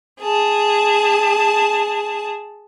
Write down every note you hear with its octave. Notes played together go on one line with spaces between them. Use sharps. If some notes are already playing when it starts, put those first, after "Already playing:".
G#4 A5